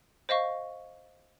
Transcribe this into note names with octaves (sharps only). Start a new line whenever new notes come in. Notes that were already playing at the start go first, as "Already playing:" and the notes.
C5 D#5 F5 C#6